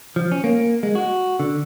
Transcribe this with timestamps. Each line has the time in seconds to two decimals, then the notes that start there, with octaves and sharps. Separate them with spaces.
0.16 F3
0.32 C#4
0.44 A#3
0.83 G#3
0.95 F#4
1.40 D3